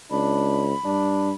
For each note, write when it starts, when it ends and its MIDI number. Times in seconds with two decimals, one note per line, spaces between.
0.11 0.73 37
0.11 0.66 62
0.11 1.34 83
0.85 1.34 43
0.85 1.30 62